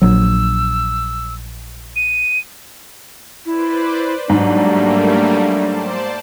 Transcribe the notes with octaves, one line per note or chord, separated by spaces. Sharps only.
A#1 F#3 E6
D#7
E4 B4 C5 D5
G#2 F#3 G3 A3 A#3 D4
C5 D5 A5